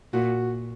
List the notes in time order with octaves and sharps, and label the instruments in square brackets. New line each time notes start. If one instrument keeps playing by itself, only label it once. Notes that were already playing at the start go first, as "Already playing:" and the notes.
[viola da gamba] A#2 [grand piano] F#4